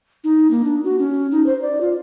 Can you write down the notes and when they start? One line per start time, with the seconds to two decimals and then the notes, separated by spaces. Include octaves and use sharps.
0.24 D#4
0.51 A#3
0.64 D4
0.84 F#4
0.99 C#4
1.31 D#4
1.46 C5
1.62 D5
1.81 F4